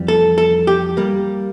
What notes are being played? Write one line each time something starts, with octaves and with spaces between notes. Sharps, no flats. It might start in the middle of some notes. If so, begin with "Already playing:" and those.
Already playing: F2 E3 G3
A4
A4
G4
G3 A#3